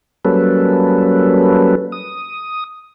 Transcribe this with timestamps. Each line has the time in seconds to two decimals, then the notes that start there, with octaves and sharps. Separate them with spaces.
0.25 F#3 G3 A#3 C#4 A4 B4
1.92 D#6